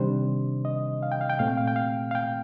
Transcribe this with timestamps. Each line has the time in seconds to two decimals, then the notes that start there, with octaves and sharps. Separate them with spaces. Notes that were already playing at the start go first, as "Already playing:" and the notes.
Already playing: C3 D#3 G3 D4 C5
0.65 D#5
1.03 F5
1.12 G5
1.21 F5
1.30 G5
1.39 A#2 A3 C4 F5
1.48 G5
1.57 F5
1.68 G5
1.76 F5
2.11 F5
2.15 G5